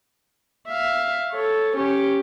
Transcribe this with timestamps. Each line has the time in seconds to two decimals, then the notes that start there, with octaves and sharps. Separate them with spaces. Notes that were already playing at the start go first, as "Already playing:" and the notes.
0.68 E5 F5
1.32 A4 C#5
1.77 C#4 G4